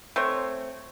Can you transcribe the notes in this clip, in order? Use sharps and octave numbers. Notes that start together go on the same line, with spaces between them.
A3 C4 C#5